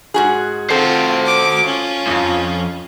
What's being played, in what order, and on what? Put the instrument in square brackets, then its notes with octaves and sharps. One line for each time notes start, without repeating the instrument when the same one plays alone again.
[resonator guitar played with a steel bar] G#2 F#4 G#4
[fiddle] C4 F4 [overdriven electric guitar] F#4 C5 [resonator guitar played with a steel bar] A4
[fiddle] D6
C#4 F4
[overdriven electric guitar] C2 F2